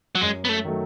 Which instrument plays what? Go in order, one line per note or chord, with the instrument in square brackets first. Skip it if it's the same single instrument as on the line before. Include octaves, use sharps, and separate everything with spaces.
[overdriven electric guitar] F#3
[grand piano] F#2 [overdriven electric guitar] G#3
[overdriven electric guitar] B3
A3
[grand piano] D#3 F#3 A3